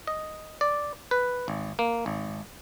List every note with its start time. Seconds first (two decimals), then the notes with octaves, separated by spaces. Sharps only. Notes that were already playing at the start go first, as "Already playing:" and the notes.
0.07 D#5
0.61 D5
1.11 B4
1.48 G#1
1.79 A#3
2.06 G#1